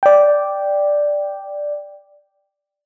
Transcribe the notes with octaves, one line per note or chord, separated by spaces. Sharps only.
D5 G5